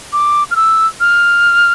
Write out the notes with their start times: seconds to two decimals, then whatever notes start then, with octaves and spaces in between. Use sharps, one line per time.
0.13 D6
0.51 F6
0.56 E6
1.00 F6